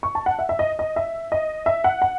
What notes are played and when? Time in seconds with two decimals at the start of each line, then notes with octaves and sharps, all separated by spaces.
0.03 C#6
0.15 A5
0.26 F#5
0.39 E5
0.49 E5
0.59 D#5
0.79 D#5
0.96 E5
1.32 D#5
1.66 E5
1.84 F#5
2.02 F#5